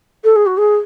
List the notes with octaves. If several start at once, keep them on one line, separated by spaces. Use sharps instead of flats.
A4
G#4
F#4
G#4